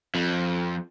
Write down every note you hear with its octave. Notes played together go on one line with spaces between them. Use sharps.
F2